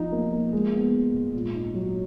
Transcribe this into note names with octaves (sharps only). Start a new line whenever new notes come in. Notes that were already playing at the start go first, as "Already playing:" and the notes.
Already playing: F3 D#4
A#3
A#3
G#3
B3
B3
G#2
A#2
D#4
F#3